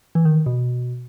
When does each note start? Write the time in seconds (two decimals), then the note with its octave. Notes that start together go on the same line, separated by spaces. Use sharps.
0.15 E3
0.25 D#3
0.46 B2